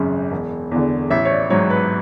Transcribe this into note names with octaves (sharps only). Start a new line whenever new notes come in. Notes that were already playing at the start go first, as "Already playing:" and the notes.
Already playing: G#1 F#2 C#3
E1
E2 D3
A1 E5
C#5
D5
G#2 F#3 C#5
B4